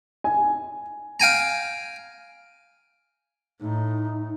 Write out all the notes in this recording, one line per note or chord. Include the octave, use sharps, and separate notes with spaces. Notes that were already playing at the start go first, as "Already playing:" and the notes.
G#5
F5 G5 G#5 A#5
A2 D#4